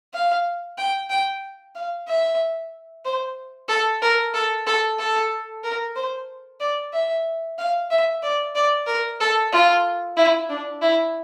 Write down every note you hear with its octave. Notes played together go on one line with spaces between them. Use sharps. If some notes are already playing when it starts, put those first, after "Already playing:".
F5
G5
G5
F5
E5
C5
A4
A#4
A4
A4
A4
A#4
C5
D5
E5
F5
E5
D5
D5
A#4
A4
F4
E4
D4
E4